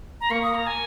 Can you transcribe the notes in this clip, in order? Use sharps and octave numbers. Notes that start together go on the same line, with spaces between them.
A#5
A#3 C#6
D#6
A#5
G#5